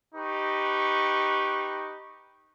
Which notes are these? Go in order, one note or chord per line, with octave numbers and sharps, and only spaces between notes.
D#4 G4 B4 C#6